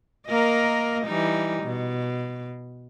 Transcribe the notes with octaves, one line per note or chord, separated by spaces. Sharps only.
A#3 A#4 D#5
E3 G3 D#4
B2